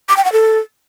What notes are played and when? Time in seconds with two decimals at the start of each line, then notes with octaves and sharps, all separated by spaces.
0.09 D6
0.17 G5
0.25 F#5
0.32 A4